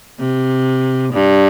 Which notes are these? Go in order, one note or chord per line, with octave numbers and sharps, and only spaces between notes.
C3
G2